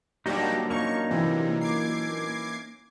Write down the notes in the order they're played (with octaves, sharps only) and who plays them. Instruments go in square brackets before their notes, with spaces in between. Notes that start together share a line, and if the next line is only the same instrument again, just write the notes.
[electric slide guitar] A#2 F#3 D4 [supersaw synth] G3 F#4 G4 [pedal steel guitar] A#3 D#4
[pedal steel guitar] A#3 C#4 D#4 [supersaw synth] C#6
[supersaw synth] C3 [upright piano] E3
[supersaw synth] D6 G#6 C7